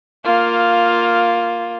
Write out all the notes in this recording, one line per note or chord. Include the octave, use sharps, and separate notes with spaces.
A#3 F4